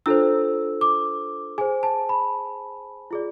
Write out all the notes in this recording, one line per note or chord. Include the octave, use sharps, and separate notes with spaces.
D4 F4 A4 C5 E6
D6
G#4 C5 G#5
A5
B5
F4 G#4 D5